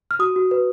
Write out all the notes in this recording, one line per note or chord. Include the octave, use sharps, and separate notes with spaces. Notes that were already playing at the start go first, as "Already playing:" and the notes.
F6
F#4 D#6
F#4
B4